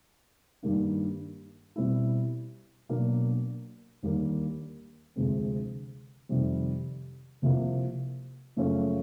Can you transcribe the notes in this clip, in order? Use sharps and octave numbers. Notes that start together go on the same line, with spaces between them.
G2 D#3 G3 A#3 D4
B2 G3 C4 E4
B2 F#3 A#3 D4
D#2 D3 G3 A#3
D2 C3 F3 G#3 C4
F2 C3 D#3 G3
C2 C3 F3 A#3
F#2 C#3 F3 A3 C#4